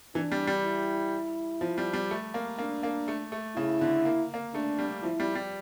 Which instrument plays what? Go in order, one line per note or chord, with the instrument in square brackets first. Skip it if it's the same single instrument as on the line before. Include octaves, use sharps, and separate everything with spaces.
[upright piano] E3 [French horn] D4
[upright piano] G3
G3
[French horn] E4
[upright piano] F3
G3
G3
A3
A#3
[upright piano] A#3 [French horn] D4
[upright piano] A#3
A3
A3
[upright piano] C#3 [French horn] E4
[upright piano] D3
A#3
A#3
[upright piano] A3 [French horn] D4
[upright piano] G3
[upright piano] F3 [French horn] E4
[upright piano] G3
G3